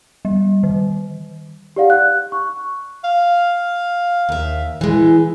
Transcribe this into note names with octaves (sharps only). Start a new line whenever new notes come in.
G3
D#3
G4 D5 F5 F#5
F#6
C#6
F5
D#2 E5
E3 G#3